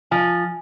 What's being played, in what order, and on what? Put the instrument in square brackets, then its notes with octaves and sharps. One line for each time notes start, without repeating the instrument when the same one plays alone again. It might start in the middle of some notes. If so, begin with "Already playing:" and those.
[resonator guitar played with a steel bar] F3 [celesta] G#5